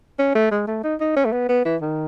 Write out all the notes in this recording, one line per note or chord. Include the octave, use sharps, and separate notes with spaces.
C#4
A3
G#3
A3
D#4
D#4
C#4
A3
B3
B3
E3
D#3